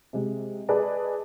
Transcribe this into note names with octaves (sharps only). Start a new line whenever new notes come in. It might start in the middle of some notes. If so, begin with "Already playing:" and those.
C3 G#3
G#4 B4 D5 D#5 A5